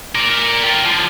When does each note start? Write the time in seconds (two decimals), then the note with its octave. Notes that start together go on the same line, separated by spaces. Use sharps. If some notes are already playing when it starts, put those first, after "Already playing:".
0.15 A#4 D5
0.64 F4 G4
0.86 D3 F3